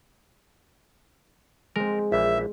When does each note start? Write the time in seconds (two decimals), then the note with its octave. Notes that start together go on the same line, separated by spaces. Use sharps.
1.76 G#3 C4 A#4
2.12 A#1 E3 E5